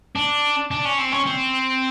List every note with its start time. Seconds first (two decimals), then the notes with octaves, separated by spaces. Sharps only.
0.15 D4
0.71 D4
0.85 C#4
0.98 C4
1.12 C#4
1.26 C4